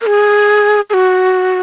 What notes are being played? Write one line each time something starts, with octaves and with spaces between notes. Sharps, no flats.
A#4
G#4
G#4
F#4